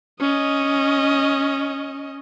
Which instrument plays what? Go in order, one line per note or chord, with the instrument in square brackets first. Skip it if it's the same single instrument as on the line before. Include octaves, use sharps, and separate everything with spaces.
[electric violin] C#4 D#5